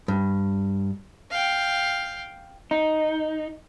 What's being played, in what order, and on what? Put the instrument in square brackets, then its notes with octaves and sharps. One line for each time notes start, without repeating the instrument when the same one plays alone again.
[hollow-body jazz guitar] G2
[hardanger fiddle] F5 G5
[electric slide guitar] D#4